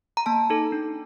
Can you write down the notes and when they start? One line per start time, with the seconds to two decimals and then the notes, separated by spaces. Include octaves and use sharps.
0.17 A#5
0.26 A#3 A5
0.50 D#4 A4
0.72 D4